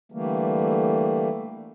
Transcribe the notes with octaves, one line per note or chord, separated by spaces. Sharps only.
D3 E3 G3 A3 A#3